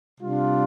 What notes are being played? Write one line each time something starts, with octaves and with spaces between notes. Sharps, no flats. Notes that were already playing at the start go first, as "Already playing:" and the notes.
C3 G3 D4 F4